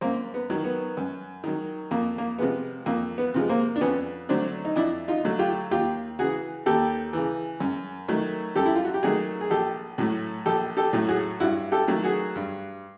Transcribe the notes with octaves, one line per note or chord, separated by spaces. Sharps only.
F#2 A#3 C4
B3
D#3 F#3
B3
F#2
D#3 F#3
F2 A#3
A#3
C3 F3 G#3 B3
F2 A#3
B3
C3 F3 G#3
A#3 C4
D4
F2 B3 C#4
D3 F#3 A3 C4 D4
D#4
F2 D4 E4
D#4 F4
D3 F#3 A3
F4 G4
D#2 F4 G4
C#3 E3 F#4 G#4
D#2 G4 A4
C#3 E3
F#2
D#3 F#3 A3
F#2 G4 A4
E4
F4
F#4
G4
D#3 F#3 A3 F#4 G#4
G#4
A#1 G4 A4
A2 F#3 A3
A#1 G4 A4
G4 A4
A2 F#3 A3
F#4 G#4
G2 E4 F#4
G4 A4
D#3 F#3 A3
F#4 G#4
G2